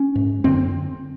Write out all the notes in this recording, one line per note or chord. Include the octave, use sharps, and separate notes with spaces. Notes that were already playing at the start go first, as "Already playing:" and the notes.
Already playing: C#4
G#2
F#2 D3 C4